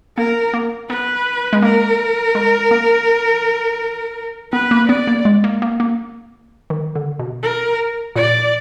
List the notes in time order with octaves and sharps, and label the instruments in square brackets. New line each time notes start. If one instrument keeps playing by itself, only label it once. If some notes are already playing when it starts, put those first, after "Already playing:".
[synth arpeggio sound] A#3 [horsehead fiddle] A#4
[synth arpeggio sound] A#3
[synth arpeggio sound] B3 [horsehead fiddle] B4
[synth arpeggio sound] G#3
[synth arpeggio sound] A#3 [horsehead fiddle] A#4
[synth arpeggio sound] G#3
A#3
[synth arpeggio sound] B3 [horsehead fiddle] B4
[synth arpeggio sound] A#3
[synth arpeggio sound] B3 [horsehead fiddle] D5
[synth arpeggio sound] A#3
G#3
A#3
A#3
A#3
D#3
D3
B2
[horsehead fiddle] A#4
[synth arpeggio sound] A#2 [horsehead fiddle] D5